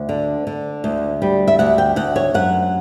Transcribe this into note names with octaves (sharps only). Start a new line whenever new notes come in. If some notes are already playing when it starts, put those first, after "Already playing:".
Already playing: D2
D3
D3
D2
G3
E5
D2 F#5
G5
D2 F#5
C#5
F#2 F#5